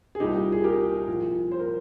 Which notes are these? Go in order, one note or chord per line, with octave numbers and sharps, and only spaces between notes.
G#4
C2 A#2 G3 D#4 G4
G#4
G4 A#4
C2 A#2 F3
C5
A#4